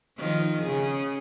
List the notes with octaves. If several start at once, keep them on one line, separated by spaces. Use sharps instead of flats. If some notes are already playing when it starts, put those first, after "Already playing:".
D#3 F3
C#3 G#4